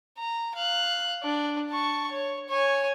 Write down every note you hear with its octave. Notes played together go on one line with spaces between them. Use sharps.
A#5
F5 F#6
D4
A5 C#6
C#5
C#5 G#5